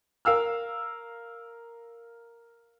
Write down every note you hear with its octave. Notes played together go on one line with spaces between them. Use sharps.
A#4 F5 E6 F6